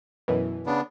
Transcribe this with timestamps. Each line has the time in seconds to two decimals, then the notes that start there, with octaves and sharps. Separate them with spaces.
0.28 F#2 B2 E3
0.66 C#3 B3 D4